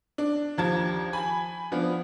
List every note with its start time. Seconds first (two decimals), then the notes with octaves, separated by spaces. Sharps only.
0.18 D4
0.58 D#2 F3 A5 G#6
1.13 G#5 B5
1.72 F3 B3 D4